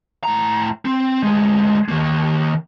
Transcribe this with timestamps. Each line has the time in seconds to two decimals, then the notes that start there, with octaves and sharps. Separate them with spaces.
0.24 A2 A#5
0.85 C4
1.23 D2 G#3
1.88 D#3 A#3